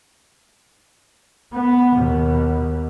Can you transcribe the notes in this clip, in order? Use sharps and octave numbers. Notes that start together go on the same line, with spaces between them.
B3
D#2 B2